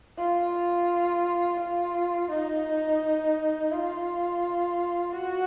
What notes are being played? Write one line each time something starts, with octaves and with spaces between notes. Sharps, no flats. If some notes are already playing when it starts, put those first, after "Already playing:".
F4
F4
D#4
F4
F#4